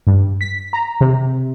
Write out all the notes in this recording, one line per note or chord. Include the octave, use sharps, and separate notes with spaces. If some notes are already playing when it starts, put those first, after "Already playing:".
G2
B6
A#5
C3